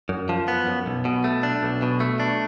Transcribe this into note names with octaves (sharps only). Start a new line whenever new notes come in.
F#2
F3
B3
F#2
B1
B2
A3
D4
B1
B2
A3
D4